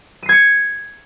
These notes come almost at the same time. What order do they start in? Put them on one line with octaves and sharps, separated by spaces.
D#7 C7 G#6 C#7